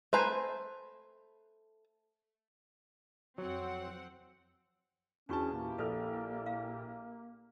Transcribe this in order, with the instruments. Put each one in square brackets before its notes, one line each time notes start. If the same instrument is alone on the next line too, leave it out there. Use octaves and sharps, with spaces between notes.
[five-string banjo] A3 B4 A#5 [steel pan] C5 G#5
[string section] F2 C4 F#5 [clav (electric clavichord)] F#3
[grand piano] E2 A5 [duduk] C#4 [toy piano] D4 F#4 C#6 [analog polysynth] G#4
[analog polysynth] A#2 E4 G4 [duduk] A#3
[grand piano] A#1 F6 [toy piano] A4 B4
[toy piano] F5